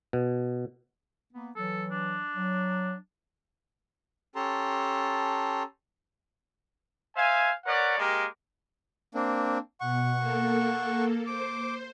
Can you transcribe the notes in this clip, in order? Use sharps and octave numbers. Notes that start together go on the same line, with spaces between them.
B2
A#3 B3
E3 F#3 A4
D4
F#3
C#4 G4 A4 A5 A#5 C6
C5 E5 F5 G#5
A#4 B4 C#5 D5 F#5
G#3 A#3 G4 A#4
A#3 C4 D4
B2 F#5 C#6
A#3 A4
C5 D6